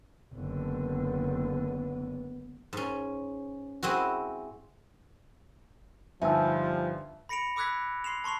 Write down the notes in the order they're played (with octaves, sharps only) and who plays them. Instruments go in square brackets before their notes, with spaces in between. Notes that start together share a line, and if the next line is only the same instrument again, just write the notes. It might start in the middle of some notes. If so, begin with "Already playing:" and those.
[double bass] F#1 D3 [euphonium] B3
[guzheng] G#2 C#4
G#3 C4 E4 F#4
[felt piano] G1 D#4 G#5 [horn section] F3 G3 [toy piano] E5 A5 E6
[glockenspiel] B5 A#6 C#7 D7 F7
B5 D6 E6 F#6 G#6 B6
C6 C7 E7 F7
A5 C6 C#6 C7 F7